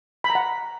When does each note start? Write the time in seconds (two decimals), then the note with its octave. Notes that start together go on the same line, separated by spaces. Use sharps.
0.24 B5
0.30 A#5
0.35 F#5